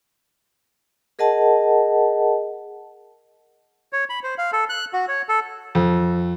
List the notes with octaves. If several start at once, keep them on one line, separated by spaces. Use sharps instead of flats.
G#4 A#4 D#5 F#5 A5
C#5
B5
C5
F5
A4
F#6
F#4
C#5
A4
F2